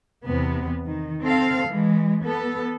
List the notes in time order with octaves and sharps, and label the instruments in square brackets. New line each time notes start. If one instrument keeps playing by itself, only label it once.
[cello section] E2 C3 B3
D#3
C4 A4 F5
E3 G#3
B3 A4